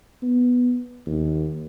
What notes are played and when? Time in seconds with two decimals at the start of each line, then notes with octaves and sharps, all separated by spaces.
0.22 B3
1.06 D#2